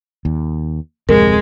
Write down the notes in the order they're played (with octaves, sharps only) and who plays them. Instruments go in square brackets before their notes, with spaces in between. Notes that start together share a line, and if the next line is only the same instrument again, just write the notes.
[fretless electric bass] D#2
[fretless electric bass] D1 F2 C3 [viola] G#3 [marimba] A#4